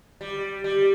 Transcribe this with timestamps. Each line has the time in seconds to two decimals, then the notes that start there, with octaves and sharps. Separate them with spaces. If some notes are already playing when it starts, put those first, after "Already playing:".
0.21 G3
0.64 G3